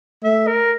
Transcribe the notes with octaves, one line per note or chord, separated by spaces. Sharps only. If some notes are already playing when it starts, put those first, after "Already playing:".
A3 E5
A#4